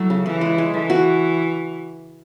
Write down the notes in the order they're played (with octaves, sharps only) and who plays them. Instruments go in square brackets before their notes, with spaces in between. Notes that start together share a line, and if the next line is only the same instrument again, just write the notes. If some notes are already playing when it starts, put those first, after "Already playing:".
Already playing: [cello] F#3 [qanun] A3 E4
[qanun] C#3
[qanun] C#3 [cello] E3
[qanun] G#3
G#3
[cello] E3 [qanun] A3
[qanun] F#4